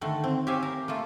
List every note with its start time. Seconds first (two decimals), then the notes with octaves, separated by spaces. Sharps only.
0.01 D3 D#3 A3
0.24 C4
0.47 G4 C#5 E5 F5 G#5
0.63 A#4
0.88 A3 A#3 F4